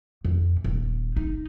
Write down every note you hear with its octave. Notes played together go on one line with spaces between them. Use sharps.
F2
D#1
D#4